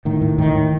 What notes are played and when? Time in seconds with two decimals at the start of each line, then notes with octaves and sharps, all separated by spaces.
0.05 A2 D#3
0.22 A2
0.38 A2 D#3
0.55 A2